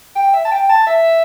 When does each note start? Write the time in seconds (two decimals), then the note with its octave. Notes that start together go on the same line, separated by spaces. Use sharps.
0.16 G5
0.33 E5
0.45 A5
0.51 G5
0.69 A5
0.87 E5